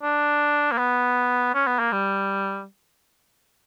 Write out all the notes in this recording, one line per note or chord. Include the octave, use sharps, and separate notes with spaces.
D4
A#3
B3
C#4
B3
A#3
G3